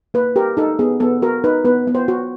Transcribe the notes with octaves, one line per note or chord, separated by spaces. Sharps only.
A#3 B4
G4 A#4
D#4 A4
B3 G#4
B3 A4
F#4 A#4
D#4 B4
B3 B4
B3
C5
F#4